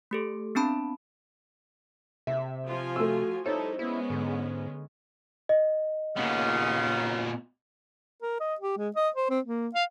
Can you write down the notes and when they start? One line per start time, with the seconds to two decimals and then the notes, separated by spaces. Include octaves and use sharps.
0.11 A3 G4 A4
0.55 B3 C4 D4 A5 B5
2.27 C3 E5
2.67 F3 F4 G#5
2.96 A3 F#4 E6
3.46 G3 D#4 E4 A4 C5 C#5
3.79 G#3 B3 C#4 E4
4.10 G#2 D3
5.49 D#5
6.16 D#2 A#2 C#3 B3
8.22 A#4
8.40 D#5
8.60 G4
8.77 G#3
8.96 D#5
9.16 C5
9.30 C4
9.45 A#3
9.74 F5